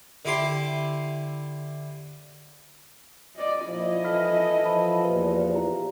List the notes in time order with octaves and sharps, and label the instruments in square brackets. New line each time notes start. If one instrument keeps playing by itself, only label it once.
[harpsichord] D3 E4 G4 C6
[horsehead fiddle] D5 D#5
[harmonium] A#2 [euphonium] F3 [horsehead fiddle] E4 D#5
[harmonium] E3 A4 [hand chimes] B5 F6 B6
[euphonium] F3 [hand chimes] A5 B5
[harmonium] E2 A#2 [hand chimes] G4 B4
[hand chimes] E4 G4 A#5